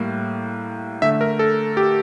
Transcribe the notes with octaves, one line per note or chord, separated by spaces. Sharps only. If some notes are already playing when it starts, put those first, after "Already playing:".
Already playing: A2 G3 A#3
D3 A3 E5
A#4
A4
G4